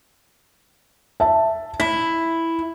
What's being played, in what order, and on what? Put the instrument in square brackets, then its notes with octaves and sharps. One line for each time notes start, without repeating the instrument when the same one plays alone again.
[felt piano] E5 A5
[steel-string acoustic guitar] E4 [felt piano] B6